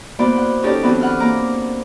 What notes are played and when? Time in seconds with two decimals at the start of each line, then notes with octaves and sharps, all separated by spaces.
0.19 A#3 B3 E4 F#4 C5 D5
0.36 F#5
0.63 C#4 D#4 G4 A4 D5
0.83 E3 F#3 B3 C4 D4 F#4
1.01 E3 F#5 F6
1.20 A#3 A#5 D6